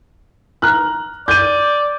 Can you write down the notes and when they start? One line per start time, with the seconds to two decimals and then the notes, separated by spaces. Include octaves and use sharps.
0.62 A#5 F6 F#6
1.28 D5 G6 D#7